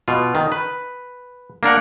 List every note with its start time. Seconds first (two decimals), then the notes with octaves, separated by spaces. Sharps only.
0.08 B2 F4
0.35 D#3
0.52 B4
1.63 A#3 D4 A#4 F#5